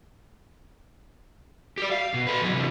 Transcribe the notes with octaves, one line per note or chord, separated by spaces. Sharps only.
G4 D5
F5
B2
A4 B4
E2 F#3
C3 E3